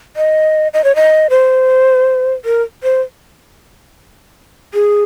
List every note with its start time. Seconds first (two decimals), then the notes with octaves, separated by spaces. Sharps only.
0.16 D#5
0.74 D#5
0.84 C#5
0.96 D#5
1.30 C5
2.45 A#4
2.83 C5
4.74 G#4